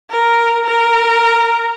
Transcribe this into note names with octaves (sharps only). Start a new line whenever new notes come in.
A#4
A#4